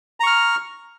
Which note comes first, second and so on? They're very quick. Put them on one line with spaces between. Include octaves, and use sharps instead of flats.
A#5 C#6 F6